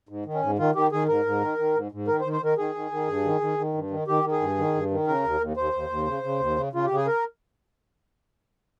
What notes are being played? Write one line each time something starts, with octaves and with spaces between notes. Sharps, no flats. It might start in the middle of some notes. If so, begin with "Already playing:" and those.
G#2
D#3
C#4
G#2
D#3 F4
D#3 G4
D#3 G#4
G#2 A#4
G#2
D#3
D#3
G#2
G#2
D#3 A#4
C5
D#3
C5
D#3 A#4
D#3 G#4
D#3
D#3
G2
D#3
D#3
D#3
G2
D#3
D#3 G4
D#3
G#4
G2
D#3
G2
D#3
C#3 A#4
D#2
D#2
D#2 C5
D#2
D#2
C#3
C#3
D#2
C#3
C#3 F4
C#3 G4
G#4
A#4